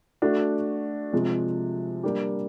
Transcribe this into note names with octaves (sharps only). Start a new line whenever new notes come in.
A3 D4 F#4
C3 F3 G#3
G3 A#3 D4 G4